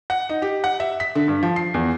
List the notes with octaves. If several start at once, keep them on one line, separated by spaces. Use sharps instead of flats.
F#5
D#4
G4
F#5
E5
B6
D3
G2
F3
C7
E2